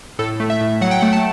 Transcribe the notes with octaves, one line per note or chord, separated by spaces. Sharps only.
A2 A4
A3
E5
A2
F#3 F#5
G5
A3 F#5
A5